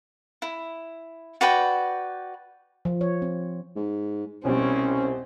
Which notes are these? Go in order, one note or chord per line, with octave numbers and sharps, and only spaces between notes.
E4
F#4 B4 D5 G5
F3
C#5
C4
G#2
C2 B2 G3 C4 C#4